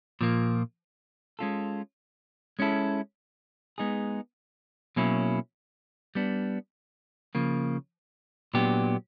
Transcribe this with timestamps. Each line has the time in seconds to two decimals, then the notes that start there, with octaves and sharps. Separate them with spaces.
0.21 A#2 F3 A#3
1.39 G#3 C#4 F4 A4
2.59 G#3 C#4 E4 A4
3.78 G#3 B3 D#4 G#4
4.96 B2 F#3 A#3 C#4 E4
6.15 G3 B3 D4
7.35 C#3 F3 A#3
8.54 A#2 F#3 B3 D4 G4